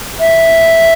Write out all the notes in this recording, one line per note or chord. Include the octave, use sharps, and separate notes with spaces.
E5